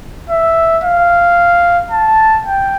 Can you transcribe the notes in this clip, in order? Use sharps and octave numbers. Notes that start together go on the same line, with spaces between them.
E5
F5
A5
G5